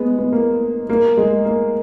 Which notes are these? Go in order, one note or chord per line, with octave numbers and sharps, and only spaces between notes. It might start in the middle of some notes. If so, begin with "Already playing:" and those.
Already playing: G#3 B3
B3
A#3
A#3
G#3
A#3